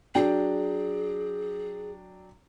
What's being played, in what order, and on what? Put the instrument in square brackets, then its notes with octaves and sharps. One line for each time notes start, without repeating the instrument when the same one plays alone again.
[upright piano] F#3 D4 G5 [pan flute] G#4